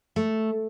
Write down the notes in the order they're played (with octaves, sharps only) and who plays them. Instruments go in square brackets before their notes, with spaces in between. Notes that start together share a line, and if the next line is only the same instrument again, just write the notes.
[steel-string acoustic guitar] A3